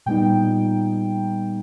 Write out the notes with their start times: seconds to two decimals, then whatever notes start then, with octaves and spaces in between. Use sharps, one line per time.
0.06 A#2 G3 B3 D#4 G5